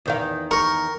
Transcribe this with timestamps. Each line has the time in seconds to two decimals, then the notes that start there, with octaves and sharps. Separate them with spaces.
0.06 E2 D#3 F5
0.51 A#4 C#6